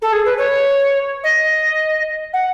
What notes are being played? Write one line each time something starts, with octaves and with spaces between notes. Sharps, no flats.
A4
G#4
B4
C#5
D#5
F#5